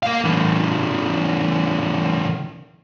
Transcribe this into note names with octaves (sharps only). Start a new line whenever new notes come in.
A#3 F5
C#3 E3